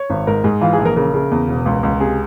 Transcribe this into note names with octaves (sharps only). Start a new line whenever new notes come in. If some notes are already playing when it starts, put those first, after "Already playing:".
Already playing: C#5
G#1
G#2 A#4
G#2 G#4
E3 F4
G#4
A#1
A#4
C#3 A#4
C#3
E2
E1
C#2
C#2
C3 G#4